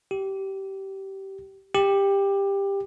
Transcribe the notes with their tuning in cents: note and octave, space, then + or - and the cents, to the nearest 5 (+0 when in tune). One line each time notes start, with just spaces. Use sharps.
G4 -20
G4 +15